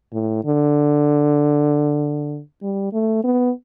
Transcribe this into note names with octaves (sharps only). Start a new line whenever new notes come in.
A2
D3
G3
A3
B3